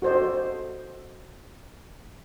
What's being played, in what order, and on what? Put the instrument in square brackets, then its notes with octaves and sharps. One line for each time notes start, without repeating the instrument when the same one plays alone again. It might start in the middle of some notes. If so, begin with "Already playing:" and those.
[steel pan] F#4 A4 C5 D5 D#5